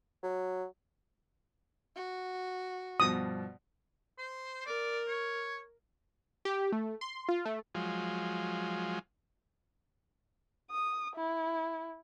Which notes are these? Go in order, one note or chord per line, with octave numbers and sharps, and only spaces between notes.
F#3
F#4
G2 B2 F3 D#6
C5
A#4 D5
C#5
G4
A3
C6
F4
A3
F3 F#3 G#3 F4
D#6
E4